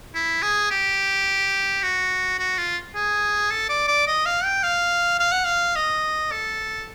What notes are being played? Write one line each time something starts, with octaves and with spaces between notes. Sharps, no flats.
E4
G#4
G4
F#4
F#4
F4
G#4
A4
D5
D5
D#5
F5
G5
F5
F5
F#5
F5
D#5
A4